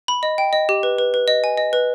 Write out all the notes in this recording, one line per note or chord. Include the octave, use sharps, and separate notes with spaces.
B5
D#5
G5
D#5
G4
B4
B4
B4
D#5
G#5
D#5
B4